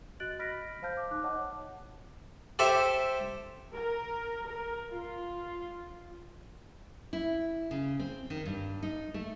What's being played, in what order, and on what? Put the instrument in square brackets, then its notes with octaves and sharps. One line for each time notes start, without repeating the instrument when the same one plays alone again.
[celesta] F#4 D#5 F#6 A6 D7 F#7
D#5 B5 F6 A#6 B6 D7
C5 F5 A5 F6 G6
D6
D#4 D6 F#6
C#5 D#5 F#5 A5 D6
[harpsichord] G4 A4 C5 E5
[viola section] A#4
A#4
F4
[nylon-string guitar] E4
C#3
C4
D#3
G2
D#4
A3